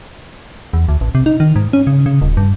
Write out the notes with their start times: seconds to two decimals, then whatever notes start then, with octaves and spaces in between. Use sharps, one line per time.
0.73 E2
0.89 D2
1.01 A1
1.15 C3
1.26 D#4
1.40 D#3
1.56 G#2
1.73 C#4
1.87 C#3
2.06 C#3
2.21 D#1
2.37 G2